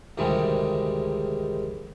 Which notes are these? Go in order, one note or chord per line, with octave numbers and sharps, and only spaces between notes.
D2 G#2 C3 D#3 G3 G#3